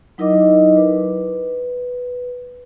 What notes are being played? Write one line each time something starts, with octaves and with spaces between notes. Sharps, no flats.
F#3 D#4 E4 A#4 D#5 D6
B4